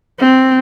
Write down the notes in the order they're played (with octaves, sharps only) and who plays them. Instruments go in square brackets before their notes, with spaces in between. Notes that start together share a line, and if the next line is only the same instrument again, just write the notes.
[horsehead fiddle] C4